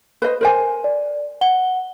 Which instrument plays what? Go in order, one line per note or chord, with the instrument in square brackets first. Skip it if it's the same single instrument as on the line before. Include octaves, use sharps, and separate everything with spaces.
[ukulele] B4 C5 D#5
A#4 C5 G#5
[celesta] D5
F#5 G7